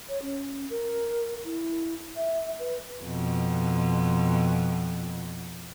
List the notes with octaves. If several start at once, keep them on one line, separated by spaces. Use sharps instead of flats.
C#5
C#4
A#4
E4
E5
B4
F2 B2